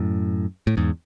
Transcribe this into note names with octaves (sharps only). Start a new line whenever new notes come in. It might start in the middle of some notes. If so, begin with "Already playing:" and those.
Already playing: F#2 A2
A2
E2 G#2